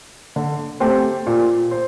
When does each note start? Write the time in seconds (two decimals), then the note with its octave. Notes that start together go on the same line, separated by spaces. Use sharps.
0.36 D3
0.80 A3 C4 G4 C5
1.27 A#2
1.71 C5